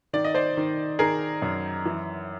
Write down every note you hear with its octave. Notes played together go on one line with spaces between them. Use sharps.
D#3 D5
D#5
C5 D5
D#3
D#3 G#4 A#4
F#2
E3